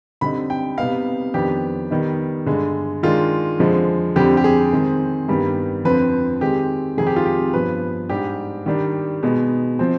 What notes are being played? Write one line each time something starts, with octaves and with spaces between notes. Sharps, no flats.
D3 G3 C4 D#4 B5
G5
C3 G3 B3 D#4 F5
F2 D#3 B3 D4 G4
D#3 G3 B3 D#4
G2 D3 G#3
D#3 G#3 D4 F4
F2 D3 F3 G#3
F2 D3 G3 C4 G4
G4
G#4
D#3 G#3 C4
G2 D#3 G3 B3
F2 D3 F3 C4 B4
D#3 G#3 C4 G4
F2 C3 D#3 G#4
G4
F4
G4
G2 F3 B3 B4
G#2 G3 D4 G4
D#3 G3 D4
B2 G#3 B3 D#4
F3 C4